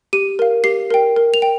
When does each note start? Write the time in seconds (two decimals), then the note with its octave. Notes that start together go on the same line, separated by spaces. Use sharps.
0.13 G4 D#7
0.39 A#4 F5
0.64 G4 C7
0.90 A#4 G5
1.16 A#4
1.34 F7
1.42 G5